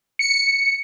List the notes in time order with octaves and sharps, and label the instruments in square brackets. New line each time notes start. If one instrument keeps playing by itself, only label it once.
[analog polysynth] C#7